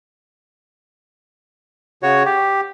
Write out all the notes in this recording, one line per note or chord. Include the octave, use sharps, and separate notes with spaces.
C#3 F#4 C#5
G4